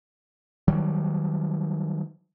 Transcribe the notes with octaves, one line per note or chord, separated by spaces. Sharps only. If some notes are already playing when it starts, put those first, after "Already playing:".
D#3 F#3 G3